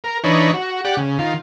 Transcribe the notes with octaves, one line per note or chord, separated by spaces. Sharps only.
A#4
E3 D4 D#4 B4 C#5
F#4
G4 D5 F#5
C#3
D#3 F4